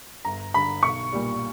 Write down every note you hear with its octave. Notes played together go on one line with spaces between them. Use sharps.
G1 A#5
G2 D3 B5
B1 C#6
A#2 G3